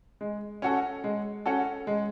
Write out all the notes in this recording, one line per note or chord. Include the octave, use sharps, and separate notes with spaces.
G#3
C#4 F#4 A4
G#3
C#4 F#4 A4
G#3